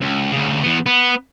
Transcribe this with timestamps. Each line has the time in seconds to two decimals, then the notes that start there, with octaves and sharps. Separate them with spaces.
0.01 C#2
0.32 D2 C#3
0.63 E2 B3
0.86 B3